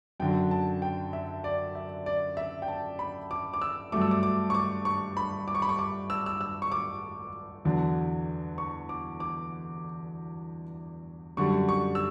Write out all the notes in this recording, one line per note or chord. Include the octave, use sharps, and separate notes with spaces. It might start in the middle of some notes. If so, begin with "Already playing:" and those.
F#2 D3 F#3 G5
A5
G5
E5
D5
E5
D5
E5
G5
A5
B5
D6
D6
E6
G2 F#3 A3 D6
E6
D6
D6
C#6
D6
C#6
B5
D6
C#6
B5
C#6
D6
E6
E6
E6
C#6
D6
E2 D3 F#3
C#6
D6
D6
F#2 D3 G3 C#6
C#6
E6